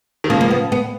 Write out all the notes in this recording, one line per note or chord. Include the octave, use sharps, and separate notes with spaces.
D#3
C#3 F3 A#3
A#3
B3
B3